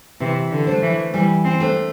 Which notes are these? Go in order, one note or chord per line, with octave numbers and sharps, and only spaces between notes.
C3 E3
D3
A3 D4 C5
E3
E3 G3
C4
A3 D4 C5